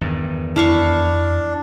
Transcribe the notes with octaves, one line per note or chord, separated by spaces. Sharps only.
E2 G2 D#3
F2 D4 E4 F5 C#6